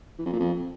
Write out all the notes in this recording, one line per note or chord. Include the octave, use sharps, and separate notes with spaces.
E3
F2
A#2
F2